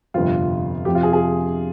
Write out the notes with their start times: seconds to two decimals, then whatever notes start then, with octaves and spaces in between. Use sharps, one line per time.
0.14 G1 F2 C3 F3 F4
0.85 F2 C3 F3 G4
0.95 F4
1.03 G#4
1.13 G#4